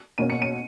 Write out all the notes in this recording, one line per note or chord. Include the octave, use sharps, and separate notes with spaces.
B2 A#3 C#4 D#7
C#7
D#7